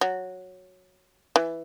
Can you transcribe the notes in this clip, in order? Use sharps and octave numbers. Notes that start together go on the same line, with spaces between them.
F#3
E3